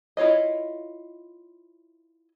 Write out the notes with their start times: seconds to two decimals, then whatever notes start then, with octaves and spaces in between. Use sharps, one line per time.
0.17 E4 F4 C#5 D#5